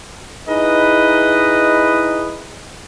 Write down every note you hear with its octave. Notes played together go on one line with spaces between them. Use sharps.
D#4 E4 G#4 B4 D#5